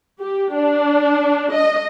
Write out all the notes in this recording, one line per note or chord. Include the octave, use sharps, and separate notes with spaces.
G4
D4
D#5